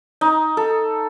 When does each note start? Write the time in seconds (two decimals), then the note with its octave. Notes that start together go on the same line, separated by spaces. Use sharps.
0.21 D#4
0.57 A4